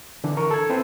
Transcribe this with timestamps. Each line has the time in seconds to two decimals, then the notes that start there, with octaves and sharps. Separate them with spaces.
0.24 D3 E3 D4
0.37 A#4 C#6
0.51 A4 G#6
0.70 C4 E4 B4 C5